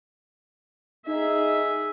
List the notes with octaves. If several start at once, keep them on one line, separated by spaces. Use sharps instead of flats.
D#4 G#4 E5